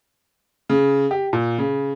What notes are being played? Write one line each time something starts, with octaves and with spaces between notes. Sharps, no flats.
C#3
G4
A#2
C#3